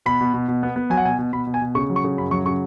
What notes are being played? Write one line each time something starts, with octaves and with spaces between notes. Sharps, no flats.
B2 B5
B2
B2
B2
B3
B3
F#3 G#5
F#5
B2 G#5
B2
B2 B5
B2
G#5
B2
C#3 C#6
F#3
C#6
C#3
F#2 B5
F#3 C#6
C#3 C#6